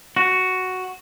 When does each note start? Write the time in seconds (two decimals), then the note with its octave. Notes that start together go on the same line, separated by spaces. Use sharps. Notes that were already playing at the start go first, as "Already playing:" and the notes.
0.16 F#4